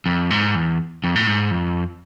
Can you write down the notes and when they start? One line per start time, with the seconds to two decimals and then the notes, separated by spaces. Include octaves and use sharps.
0.06 F2
0.30 G#2
0.55 E2
1.04 F2
1.16 A2
1.27 G#2
1.51 F2